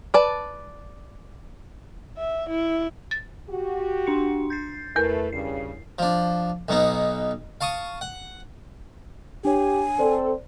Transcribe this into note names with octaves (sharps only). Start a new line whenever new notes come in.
B4 D5 A5
E5
E4
A6
F#4 G4
D4 C6 C#7
G6 A6 C7
E2 A3 A#4 B4
G2 C#3 C7
F3 D4
B1 B2 B3 D#4
F5 A5 C#6 D#6
F#5
D4 G4 C#5 G#5
C4 A4 C5 D5